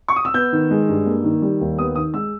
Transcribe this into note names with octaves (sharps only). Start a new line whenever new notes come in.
C#6
D#6
E6
B3 G6
D#3
G#3
G2
A#3
D#3
G3
D#2
B3 D#6
D#3 D#6
G#3 E6